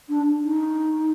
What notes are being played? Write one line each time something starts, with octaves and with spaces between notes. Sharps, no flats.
D4
D#4